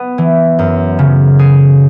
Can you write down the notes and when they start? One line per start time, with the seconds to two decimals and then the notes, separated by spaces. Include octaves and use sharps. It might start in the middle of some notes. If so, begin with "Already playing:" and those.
Already playing: B3
0.18 E3
0.59 F#2
0.99 C#3
1.39 G#4